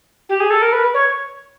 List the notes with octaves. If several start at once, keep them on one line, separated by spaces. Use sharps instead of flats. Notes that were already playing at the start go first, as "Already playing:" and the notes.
G4
G#4
A4
A#4
B4
C#5